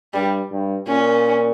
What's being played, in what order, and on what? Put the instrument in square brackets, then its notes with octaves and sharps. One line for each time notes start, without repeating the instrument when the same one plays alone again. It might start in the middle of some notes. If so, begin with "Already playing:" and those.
[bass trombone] G2 [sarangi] G3
[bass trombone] G2
[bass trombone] A#2 [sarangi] C#4